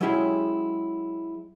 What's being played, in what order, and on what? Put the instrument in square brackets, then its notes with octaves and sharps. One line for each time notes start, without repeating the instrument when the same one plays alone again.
[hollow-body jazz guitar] F#3 G#3 C#4 E4 G4 G#4